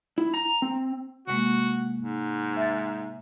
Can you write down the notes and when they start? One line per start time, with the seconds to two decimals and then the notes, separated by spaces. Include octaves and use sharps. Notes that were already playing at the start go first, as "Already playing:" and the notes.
0.18 E4
0.34 A#5
0.62 C4
1.28 C3 G#3 A#3 F#4
2.01 G#2
2.57 E5 A6